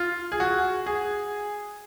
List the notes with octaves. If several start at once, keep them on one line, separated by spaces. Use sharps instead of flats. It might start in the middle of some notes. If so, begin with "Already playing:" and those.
Already playing: F4
G#4
F#4
G#4